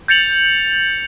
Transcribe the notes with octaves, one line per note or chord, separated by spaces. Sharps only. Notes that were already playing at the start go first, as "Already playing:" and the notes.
G6 A6 C#7 F7 F#7